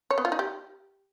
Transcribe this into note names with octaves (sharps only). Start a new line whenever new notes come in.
C#5
B3
F4
D#4
G4